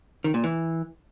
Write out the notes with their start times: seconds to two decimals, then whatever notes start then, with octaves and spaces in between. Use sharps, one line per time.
0.24 D#3
0.34 A#2
0.44 E3